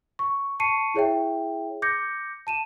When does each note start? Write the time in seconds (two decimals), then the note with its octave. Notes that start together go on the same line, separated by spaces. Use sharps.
0.19 C#6
0.60 A5 C#6 C7 C#7 D#7
0.94 E4 G#4 C#5 E5 G5
1.82 D6 G6 A#6 C#7
2.47 A5 D#7 E7